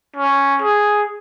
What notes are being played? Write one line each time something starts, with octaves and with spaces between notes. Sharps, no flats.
C#4
G#4